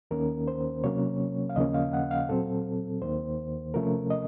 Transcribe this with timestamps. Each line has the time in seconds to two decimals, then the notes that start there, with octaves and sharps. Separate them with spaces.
0.11 D#2 D#3 A#3 C#4 A#4
0.48 C5
0.84 C3 F#3 A#3 C#4 C#5
1.49 F5
1.56 D#2 C#3 F3 A#3 C#4 D#5
1.74 F5
1.93 F#5
2.11 F5
2.29 A#2 F#3 C4 A4
3.02 D#2 D#3 A#3 C5
3.74 C3 F3 A3 C#4 A#4
4.10 D#5